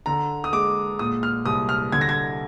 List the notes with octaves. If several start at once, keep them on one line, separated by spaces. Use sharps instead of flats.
D3 A#5
D#6
G#3 D6
A#2 D#6
F6
C2 D#6
F6
D3 G#6
A#6
G#6